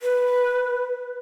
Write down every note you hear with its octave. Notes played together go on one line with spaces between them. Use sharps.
B4